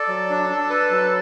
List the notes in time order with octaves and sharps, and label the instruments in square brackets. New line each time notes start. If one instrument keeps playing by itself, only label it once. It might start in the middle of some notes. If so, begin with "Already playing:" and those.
Already playing: [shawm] A4 [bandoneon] D5
[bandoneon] F#3
D4
D4
B4
F#3